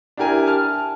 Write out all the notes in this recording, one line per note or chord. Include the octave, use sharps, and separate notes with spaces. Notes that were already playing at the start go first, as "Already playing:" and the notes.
D4 E4 G4 A#4 G#5
A5 F6